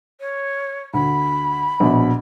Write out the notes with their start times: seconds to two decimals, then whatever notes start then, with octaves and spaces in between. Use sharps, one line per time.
0.20 C#5
0.94 D2 B5
1.80 A#1 B2